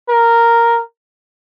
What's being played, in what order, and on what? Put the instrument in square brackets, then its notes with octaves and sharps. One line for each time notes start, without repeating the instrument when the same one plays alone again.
[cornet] A#4